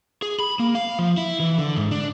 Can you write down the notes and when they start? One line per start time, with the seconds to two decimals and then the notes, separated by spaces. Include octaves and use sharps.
0.22 G#4
0.40 B5
0.60 A#3
0.75 F5
0.99 F3
1.17 E4
1.40 E3
1.58 D3
1.77 G#2
1.91 D4